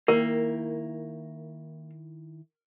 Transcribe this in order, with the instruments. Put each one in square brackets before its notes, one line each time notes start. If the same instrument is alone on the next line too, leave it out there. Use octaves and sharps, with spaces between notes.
[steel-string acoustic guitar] D#3 E4 G5 [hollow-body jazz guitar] A#3 [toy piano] A#4